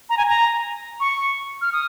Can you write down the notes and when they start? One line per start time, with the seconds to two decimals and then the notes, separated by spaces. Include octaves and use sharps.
0.10 A#5
0.17 G#5
0.29 A#5
1.00 C#6
1.62 F6
1.73 D#6